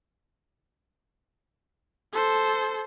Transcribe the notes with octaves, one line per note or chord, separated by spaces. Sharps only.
A4 C5